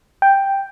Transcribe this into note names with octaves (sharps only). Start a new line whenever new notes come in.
G5